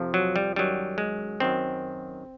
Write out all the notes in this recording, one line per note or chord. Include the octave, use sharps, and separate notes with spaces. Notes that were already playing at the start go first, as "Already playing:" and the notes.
Already playing: F2 C3 F3
F#3
G3
F#2 D#3 F#3 G3
G#3
F#2 D#3 F#3 C4